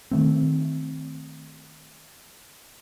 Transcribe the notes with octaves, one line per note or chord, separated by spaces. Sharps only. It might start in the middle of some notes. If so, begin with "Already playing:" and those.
D#3 A3 C4